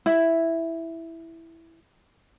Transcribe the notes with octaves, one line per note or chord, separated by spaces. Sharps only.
E4